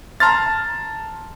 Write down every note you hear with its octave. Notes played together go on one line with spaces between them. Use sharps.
A5 A#5 C6 F6 A6